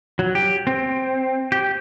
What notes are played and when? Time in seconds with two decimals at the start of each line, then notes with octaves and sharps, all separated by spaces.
0.19 F#3
0.35 G4
0.67 C4
1.52 G4